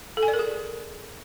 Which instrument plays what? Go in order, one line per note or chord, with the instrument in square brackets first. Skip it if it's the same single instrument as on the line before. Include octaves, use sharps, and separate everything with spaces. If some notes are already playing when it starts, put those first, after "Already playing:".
[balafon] A4
G#5
D5
A#4
G#4